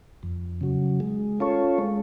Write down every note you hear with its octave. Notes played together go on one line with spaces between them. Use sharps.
F2
C#3 F#3
G#3
C#4 F4 A4 C#5
G#3